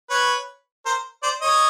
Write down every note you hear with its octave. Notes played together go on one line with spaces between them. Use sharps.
B4 C#5
A#4 C5
C5 D5
C#5 D#5